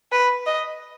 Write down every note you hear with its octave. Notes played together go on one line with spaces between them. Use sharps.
B4
D#5